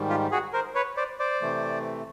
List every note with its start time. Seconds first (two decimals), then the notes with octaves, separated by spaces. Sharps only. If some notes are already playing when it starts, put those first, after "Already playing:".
Already playing: G#2 D#3 G3
0.09 F4 G4
0.31 F#4 G#4
0.53 A#4 C5
0.75 B4 C#5
0.97 C5 D5
1.19 C5 D5
1.42 C3 E3 A3